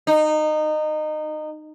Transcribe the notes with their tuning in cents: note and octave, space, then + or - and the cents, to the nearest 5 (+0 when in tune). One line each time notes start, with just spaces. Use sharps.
D#4 -20